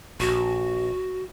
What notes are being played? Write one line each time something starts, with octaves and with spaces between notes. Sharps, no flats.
A#1 F#4